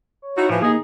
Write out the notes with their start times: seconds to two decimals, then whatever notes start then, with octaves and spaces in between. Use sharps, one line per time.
0.22 C#5
0.38 D#4 E4 F#4
0.49 A2 E3 F3
0.62 D#2 A#3 D#4 G#4